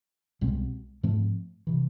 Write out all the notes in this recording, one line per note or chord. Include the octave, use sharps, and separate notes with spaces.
C2 B2 G#3 C4
G#2 F3 A3 C4
C3 E3